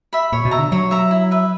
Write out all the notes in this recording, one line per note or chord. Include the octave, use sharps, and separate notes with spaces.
E5 B5
A#2 C#5
B2
E5 A#5
D3
F#3 C#5
E5 A#5
E4
B4 E5